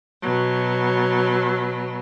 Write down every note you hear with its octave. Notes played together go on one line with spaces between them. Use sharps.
B2 F#3